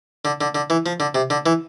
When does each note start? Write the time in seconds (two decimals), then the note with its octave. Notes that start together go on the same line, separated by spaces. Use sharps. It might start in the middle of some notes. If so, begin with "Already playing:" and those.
0.25 D3
0.41 D3
0.55 D3
0.70 E3
0.86 F3
1.00 D3
1.15 C3
1.30 D3
1.46 E3